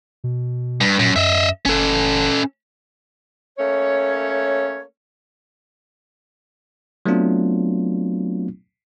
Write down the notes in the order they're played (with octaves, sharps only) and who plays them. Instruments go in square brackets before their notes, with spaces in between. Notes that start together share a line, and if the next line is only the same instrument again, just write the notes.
[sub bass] B2
[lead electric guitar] G2
[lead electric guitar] F#2 [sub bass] A#2
[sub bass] F#2 [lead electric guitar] D#5 E5
[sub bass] F#1 [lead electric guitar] C#4 A4
[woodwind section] A3 A#3 C#4 C#5
[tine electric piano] F#3 A3 B3 C4 D4 F4